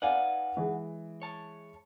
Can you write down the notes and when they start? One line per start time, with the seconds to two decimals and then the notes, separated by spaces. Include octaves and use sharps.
0.02 D#4 B4 D5 F5 F#5 G#5
0.57 E3 G#3 G#4
1.22 C#5 A5